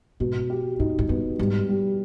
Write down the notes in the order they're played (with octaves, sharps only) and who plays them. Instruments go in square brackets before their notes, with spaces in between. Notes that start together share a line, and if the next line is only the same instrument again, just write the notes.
[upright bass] G#2 [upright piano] B2
[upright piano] G4
[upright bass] G#2 [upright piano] D#4
[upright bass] G#2
[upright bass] G2 [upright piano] B3
[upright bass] G#2 [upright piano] G3
[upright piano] G3